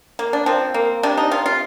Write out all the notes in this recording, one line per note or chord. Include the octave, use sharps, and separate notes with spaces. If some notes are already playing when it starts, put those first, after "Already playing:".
A#3
D4
F3 C4
A#3
C3 D4
D#4
C3 F4
F4